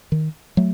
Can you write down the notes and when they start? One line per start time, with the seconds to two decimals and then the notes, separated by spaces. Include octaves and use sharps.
0.12 D#3
0.57 F#3 A3